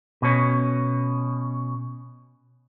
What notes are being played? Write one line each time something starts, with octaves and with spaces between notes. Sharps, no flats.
B2 C#4